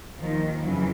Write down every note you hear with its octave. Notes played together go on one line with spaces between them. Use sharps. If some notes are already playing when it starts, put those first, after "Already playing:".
D#2 D#3 F3
F2 C#3 E3 F#3